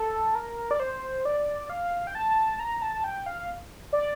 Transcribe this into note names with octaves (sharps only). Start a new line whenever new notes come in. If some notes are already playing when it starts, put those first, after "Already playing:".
Already playing: A4
A#4
D5
C5
D5
F5
G5
A5
A#5
A5
G5
F5
D5